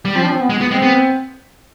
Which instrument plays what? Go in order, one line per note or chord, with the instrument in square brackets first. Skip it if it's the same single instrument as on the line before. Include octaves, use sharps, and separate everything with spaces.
[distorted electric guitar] G3
[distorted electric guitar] F3 [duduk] C4
[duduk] D4
C4
B3
[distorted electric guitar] G#3
B3
[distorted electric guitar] G#3 [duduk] C4
[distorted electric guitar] B3